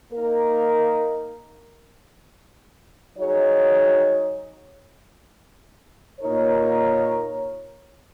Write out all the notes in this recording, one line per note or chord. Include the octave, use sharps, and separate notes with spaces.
A#3 D#4 A#4
F#3 D#4 G#4 C#5
A#2 A#3 D#4 A#4 C#5